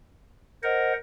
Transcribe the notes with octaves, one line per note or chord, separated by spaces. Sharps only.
A#4 C5 D#5 F#5